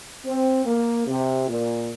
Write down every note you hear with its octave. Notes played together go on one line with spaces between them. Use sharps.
C4
A#3
C3
A#2